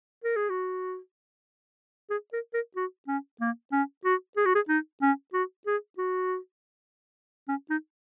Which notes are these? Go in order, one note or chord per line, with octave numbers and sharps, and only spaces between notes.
A#4
G#4
F#4
G#4
A#4
A#4
F#4
C#4
A#3
C#4
F#4
G#4
F#4
G#4
D#4
C#4
F#4
G#4
F#4
C#4
D#4